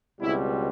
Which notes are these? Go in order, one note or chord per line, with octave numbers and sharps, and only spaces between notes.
C#2 B2 G3 C4 E4